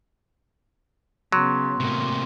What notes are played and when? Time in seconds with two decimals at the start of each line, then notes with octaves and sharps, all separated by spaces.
1.32 C#3 F#3 B3 C6
1.80 A2 C3 A#3